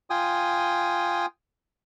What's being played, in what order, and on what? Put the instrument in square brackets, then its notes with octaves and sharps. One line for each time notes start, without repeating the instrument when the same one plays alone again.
[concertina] F4 G5 G#5 D#6